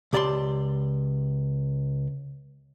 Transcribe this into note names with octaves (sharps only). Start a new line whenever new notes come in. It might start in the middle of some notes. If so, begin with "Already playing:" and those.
C#2 G4 D5 F5 A5 C6